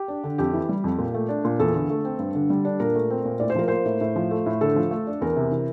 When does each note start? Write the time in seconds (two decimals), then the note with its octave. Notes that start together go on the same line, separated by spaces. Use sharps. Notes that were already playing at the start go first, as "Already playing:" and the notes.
Already playing: G4
0.08 D4
0.24 D3
0.38 F2 G4
0.53 E3
0.69 G3
0.84 F2
0.98 A#2
1.14 A3
1.29 D4
1.44 A#2
1.59 E2 A4
1.74 D3
1.90 A3
2.05 C4
2.19 G2
2.35 D3
2.50 G3
2.65 D4
2.80 A#2 A#4
2.95 A3
3.10 C4
3.25 A#2
3.40 A2 D5
3.50 C5
3.55 F3 A#4
3.68 A#3 C5
3.85 A2
4.01 A2
4.16 F3
4.31 A3
4.46 A2
4.61 D3 A4
4.76 F3
4.91 A3
5.07 D4
5.21 E2 A#4
5.36 C3
5.51 E3